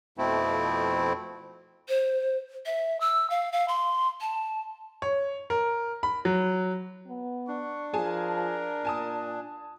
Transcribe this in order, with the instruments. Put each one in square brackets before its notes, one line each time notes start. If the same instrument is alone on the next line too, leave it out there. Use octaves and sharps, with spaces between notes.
[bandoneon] F2 B2 F3 A3 C4 E4
[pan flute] C5
E5
E6
F5
F5
C6
A5
[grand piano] C#5
A#4
B5
F#3
[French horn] B3
[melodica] D4 [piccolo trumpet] C#6
[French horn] F3 [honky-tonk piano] G#4 G#5 A5 [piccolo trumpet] A#4
[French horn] A#2 [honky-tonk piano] G#5 A5 D#6